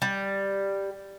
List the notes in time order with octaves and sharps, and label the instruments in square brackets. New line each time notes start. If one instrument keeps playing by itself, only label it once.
[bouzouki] G3